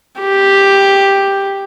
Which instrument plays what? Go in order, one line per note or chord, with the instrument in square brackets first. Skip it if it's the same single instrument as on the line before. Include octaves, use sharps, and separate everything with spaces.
[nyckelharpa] G4